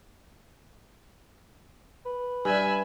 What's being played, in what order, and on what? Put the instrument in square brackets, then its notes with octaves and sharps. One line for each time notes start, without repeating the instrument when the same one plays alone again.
[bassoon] B4
[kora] G2 [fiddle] E5 B5 [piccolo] G#5